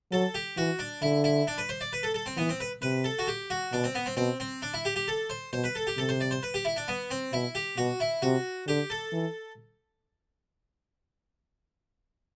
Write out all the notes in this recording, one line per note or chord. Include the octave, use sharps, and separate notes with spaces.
F#3 A4
G4
E3 F#4
D4
D3 E4
E4
D4
B4
C5
D5
B4
A4
A4
C4
E3 B3
C4
B4
C3 B4
A4
F#4
G4
F#4
B2 D4
C4
B3
C4
B2 C4
C4
D4
E4
G4
G4
A4
C5
B2 C5
B4
A4
G4
C3 A4
C5
D5
C5
B4
G4
E4
D4
B3
C4
B2 E4
G4
B2 F#4
E4
C3 F#4
D3 G4
A4
E3